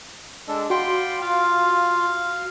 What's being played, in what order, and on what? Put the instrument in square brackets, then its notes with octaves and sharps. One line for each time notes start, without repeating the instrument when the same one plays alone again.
[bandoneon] G#3 D4 [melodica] A4
[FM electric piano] F#4 C6 [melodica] D5 F5 B5 [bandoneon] G5
[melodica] F4 [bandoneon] F5